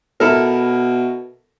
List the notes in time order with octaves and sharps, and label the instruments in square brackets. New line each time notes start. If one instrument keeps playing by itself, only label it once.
[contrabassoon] B2 [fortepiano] E4 A4 A#4